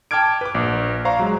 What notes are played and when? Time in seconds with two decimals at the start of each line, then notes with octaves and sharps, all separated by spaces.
0.11 G5 A5 D6 F6 G#6 D7
0.41 B4 D6
0.55 A#1
1.05 C5 D5 F5 A#5 C#6
1.19 F#3 G#3